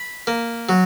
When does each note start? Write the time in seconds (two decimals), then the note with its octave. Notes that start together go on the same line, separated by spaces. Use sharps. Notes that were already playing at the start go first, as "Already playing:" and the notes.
Already playing: B5
0.27 A#3
0.69 F#3